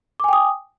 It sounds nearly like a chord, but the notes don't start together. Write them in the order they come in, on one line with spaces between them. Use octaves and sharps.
D6 G#5 G5 D#6